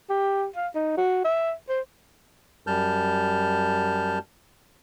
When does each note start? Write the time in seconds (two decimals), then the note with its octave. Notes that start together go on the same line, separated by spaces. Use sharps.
0.10 G4
0.56 F5
0.75 D#4
0.97 F#4
1.25 E5
1.69 C5
2.67 F#2 G3 A5 F6 G6